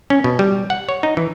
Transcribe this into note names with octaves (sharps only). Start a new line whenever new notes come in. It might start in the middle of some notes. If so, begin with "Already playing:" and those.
C#4
B2
G3
F#5
C#5
D#4
E3